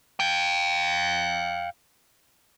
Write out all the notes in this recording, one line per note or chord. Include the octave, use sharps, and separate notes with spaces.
F5 G5